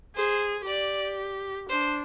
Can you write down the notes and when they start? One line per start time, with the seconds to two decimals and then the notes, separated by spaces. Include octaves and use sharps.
0.16 G#4 C5
0.67 G4 D5
1.69 D4 C5